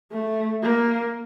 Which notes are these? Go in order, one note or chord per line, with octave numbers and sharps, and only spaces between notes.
A3
A#3